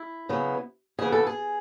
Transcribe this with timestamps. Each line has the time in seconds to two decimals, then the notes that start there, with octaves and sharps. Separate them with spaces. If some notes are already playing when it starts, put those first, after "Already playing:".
Already playing: E4
0.29 C#3 F#3 B3
0.99 C#3 E3 B3 G#4
1.12 A4
1.27 G#4